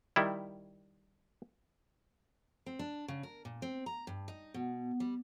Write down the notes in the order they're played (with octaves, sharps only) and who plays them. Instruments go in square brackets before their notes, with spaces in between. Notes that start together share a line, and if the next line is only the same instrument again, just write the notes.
[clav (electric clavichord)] D#3 G3 E4
[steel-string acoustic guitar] C4
D4
C#3
A#4
A#2
C4
A#5
G2
D#4
B2
G3